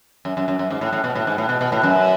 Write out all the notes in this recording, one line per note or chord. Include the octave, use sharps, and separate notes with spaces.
F#2
F#2
F#2
F#2
G#2
A2
A2
B2
A2
G#2
A2
B2
B2
A2
F#2